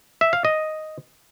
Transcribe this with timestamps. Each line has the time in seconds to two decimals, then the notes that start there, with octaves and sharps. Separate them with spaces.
0.21 E5
0.33 F5
0.45 D#5